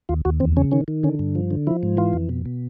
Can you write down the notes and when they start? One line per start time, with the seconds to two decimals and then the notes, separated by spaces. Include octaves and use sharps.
0.09 D#2 F4
0.25 D#2 F#4
0.40 E2 C4
0.57 C#3 C#4
0.72 D#3 C#4
0.88 D#3
1.03 D3 C#4
1.19 G2
1.35 F3
1.51 D3
1.67 F3 E4
1.83 G#2
1.97 E3 F4
2.13 F2
2.29 B2
2.46 B2